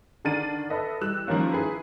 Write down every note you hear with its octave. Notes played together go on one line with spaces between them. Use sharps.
D3 D#3 D4 F6 A6 D#7
A4 B4 D#5 E5
E3 G3 E6 F#6 E7
D#3 F3 G3 A#3 C#4
E4 G#4 B4